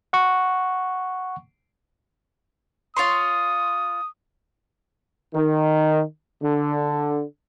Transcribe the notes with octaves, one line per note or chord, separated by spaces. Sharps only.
F#5 C#6
F4 C#5 C6 D#6
D#3
D3